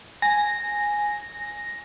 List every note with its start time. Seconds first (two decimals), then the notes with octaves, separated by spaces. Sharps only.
0.22 G#5 A#6